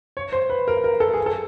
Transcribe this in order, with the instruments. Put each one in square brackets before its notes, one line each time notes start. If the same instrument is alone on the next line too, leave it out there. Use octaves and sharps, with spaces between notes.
[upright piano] C#5
C5
B4
A#4
A#4
A4
G#4
A4